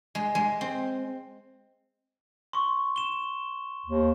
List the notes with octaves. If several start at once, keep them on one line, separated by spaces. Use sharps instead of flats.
G#3
G#3
C4
C6 C#6
E7 G7
D#2